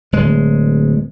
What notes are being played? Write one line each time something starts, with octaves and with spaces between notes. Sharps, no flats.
D1 G#3